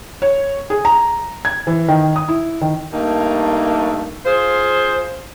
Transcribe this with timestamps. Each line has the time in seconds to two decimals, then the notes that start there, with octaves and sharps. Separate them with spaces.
0.22 C#5
0.70 G#4
0.85 A#5
1.45 G#6
1.67 E3
1.88 D#3
2.16 D#6
2.29 E4
2.61 D#3
2.92 G2 A3 A#3 D#4
4.26 F4 G#4 C5